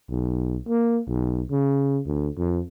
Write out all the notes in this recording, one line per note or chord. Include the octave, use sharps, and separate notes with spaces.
B1
A#3
B1
C#3
D2
F2